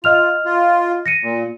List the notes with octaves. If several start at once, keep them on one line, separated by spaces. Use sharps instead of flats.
F4 D#5 F6 F7
F4
A#6 C#7 D#7
A#2